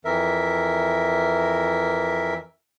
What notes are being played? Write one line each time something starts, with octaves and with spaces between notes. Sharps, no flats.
F2 E3 A#4 E5